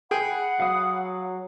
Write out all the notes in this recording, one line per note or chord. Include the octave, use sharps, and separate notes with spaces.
G#4 F#5 G5 B5
F#3 F5 D#6